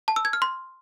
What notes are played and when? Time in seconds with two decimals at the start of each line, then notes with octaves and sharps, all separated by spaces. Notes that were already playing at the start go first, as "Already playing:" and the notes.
0.08 A5
0.16 E6
0.25 G#6
0.33 F6
0.42 C6